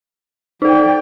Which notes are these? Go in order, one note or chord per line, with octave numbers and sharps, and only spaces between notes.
D#4 A4 D5 G5